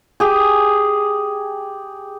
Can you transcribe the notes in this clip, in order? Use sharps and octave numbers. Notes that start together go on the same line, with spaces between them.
G4 G#4